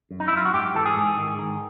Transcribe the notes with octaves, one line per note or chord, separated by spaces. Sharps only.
F#2
D#4
E4
F#2 F4
F#4
G#2 G4
E3 A4
G#4
G#2
D#3
D#3